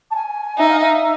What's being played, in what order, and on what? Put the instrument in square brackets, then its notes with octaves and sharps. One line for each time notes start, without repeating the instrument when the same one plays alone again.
[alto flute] A5
G#5
[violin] D#4 [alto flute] E5
[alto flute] F5
E5